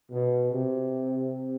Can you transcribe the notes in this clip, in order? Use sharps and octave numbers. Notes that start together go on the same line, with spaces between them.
B2
C3